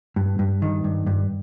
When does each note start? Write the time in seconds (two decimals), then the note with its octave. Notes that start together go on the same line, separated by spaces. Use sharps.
0.16 G2
0.39 G2
0.62 D#3
0.84 G2
1.06 G2